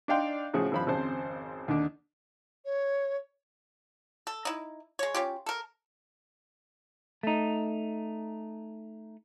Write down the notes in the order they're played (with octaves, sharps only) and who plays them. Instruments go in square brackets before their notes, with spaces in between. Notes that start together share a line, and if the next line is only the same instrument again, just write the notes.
[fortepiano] D4 D#4 D5 F5 G5 C6
A2 C#3 F3 F#4 G#4
G#1 G2 F3 F5 B5
G#1 F2 C#3 C5 A5
D#2 D3 D4
[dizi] C#5
[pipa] A4
D#4 E4
G#3 C#5
C#4 F4 G4
A4 A#4
[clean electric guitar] A3 D#4